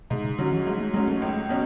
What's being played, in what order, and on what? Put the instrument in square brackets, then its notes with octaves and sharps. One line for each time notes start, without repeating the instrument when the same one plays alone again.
[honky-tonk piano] G#2 [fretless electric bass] B2
[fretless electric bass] C#3
[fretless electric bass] D3 [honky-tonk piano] F#3 C#4
[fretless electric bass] E3
[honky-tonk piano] G#2 [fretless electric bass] F#3
[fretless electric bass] A3
[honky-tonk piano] F#3 [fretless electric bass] G#3
[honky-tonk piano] C#4
[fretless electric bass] A3
[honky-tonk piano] C#2
B2 F#3 C#4